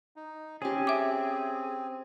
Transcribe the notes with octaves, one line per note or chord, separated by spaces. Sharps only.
D#4
C4 C#4 G4 G#4
E5 D6